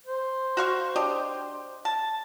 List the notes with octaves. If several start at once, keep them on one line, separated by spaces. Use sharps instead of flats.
C5
F#4 F5 C#6
D4 G4 D#5
A5